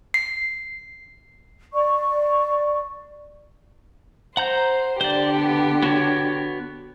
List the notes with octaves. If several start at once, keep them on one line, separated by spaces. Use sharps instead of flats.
C7
D5 C#6
C5 F#5 A#5 G6
D3 G4 C5 D5
B3
B3 F#4 C#5